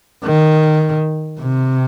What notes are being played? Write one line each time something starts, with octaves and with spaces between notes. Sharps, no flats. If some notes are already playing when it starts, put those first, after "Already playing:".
D#3
C3